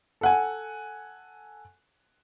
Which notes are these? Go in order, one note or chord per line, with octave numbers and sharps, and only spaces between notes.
A4 F#5 G#5